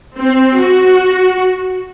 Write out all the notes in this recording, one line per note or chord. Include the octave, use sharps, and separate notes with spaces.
C4
F#4